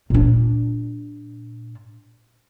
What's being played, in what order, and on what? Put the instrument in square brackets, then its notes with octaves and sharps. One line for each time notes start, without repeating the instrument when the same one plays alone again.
[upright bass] A#2 D4